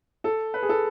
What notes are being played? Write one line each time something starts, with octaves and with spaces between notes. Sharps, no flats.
A4
B4
G#4
A4